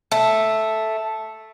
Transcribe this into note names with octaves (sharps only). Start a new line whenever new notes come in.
A3